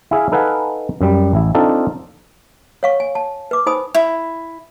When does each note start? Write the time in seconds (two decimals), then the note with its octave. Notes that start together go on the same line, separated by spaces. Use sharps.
0.11 E4 G#4 E5 F5
0.32 D#4 A4 B4 F5 F#5 G#5
1.01 F#2 G3
1.33 A1 E4
1.55 C4 D4 D#4 F4 A4
2.83 C#5 F5 C#6
3.00 G#5
3.15 A5
3.51 B4 D6
3.66 D#4 C5 G#5 B5 D#6
3.95 E4